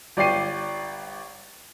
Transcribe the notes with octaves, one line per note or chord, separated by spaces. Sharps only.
G1 D5 G5 C7 D#7